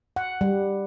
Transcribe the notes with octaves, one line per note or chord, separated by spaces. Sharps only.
F#5
G3